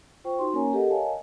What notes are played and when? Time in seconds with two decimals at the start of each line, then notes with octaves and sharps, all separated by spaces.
0.24 F4 C5 G5 C#6
0.39 D#4 F#4 C6
0.53 A#3 C#4 A#4 C#5 G#5 A#5
0.73 G4 A4 A#4 D#5 F#5
0.90 A#4 C#5 D#5 F5 G#5 A5